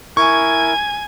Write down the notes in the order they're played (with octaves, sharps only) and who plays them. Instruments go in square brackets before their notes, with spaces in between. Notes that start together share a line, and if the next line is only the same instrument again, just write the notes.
[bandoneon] E4 A#4 [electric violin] G#5 G#6 [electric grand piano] C#6